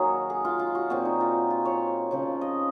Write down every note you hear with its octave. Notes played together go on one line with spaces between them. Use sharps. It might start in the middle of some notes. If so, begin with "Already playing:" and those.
Already playing: D#3 F#3 A#3 F#4 G#4
G#4
F4
F4
F#4
A#2 F#3 C4 F#4
D#4
F4
F4
C#5
C#3 F3 C4
D#5